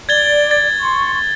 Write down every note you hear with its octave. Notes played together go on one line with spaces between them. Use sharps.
D5 G#6 A6 G7
A6
C6 C#6